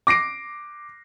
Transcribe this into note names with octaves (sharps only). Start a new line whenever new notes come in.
D6 A#6 C7 D7